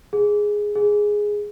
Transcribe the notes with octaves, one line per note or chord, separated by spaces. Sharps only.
G#4
G#4